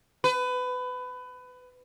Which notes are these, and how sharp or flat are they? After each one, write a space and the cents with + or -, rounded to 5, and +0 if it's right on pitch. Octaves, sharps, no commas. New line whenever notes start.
B4 +25